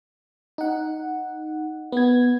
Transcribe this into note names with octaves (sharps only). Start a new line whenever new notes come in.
D#4 F#5
B3 G#6